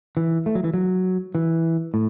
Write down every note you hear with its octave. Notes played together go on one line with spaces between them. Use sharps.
E3
A3
F#3
E3
F#3
E3
A2